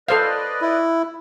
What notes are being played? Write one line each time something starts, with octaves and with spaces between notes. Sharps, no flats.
A4 B4 C5 D5 D#5 F5
E4